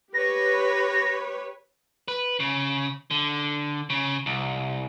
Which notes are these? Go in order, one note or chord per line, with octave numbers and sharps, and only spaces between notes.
G4 B4 C#5 A#6
B4
C#3
D3
C#3
C2